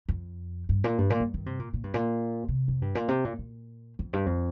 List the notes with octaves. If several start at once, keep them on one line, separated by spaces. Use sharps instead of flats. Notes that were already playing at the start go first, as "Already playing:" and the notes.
F2
G2
A#2
G2
A#2
G2
D#3
C3
A#2
A#2
G2
A#2
C3
F2
G2
A#2
C3
A#2
A#2
F2
G2
F2